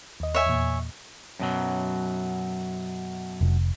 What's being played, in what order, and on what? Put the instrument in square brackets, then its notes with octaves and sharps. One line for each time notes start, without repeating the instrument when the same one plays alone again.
[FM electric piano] D#2 D#5
[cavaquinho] C#5 E5 G#5
[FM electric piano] E2 A#2
[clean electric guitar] F#2 B2 F#3
[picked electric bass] F1